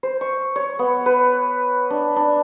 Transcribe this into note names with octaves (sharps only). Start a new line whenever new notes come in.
C5
C#6
C#5
B3
B4
D4
D4